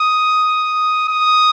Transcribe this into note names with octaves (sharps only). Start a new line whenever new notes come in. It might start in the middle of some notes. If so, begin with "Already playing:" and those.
Already playing: D#6
D#6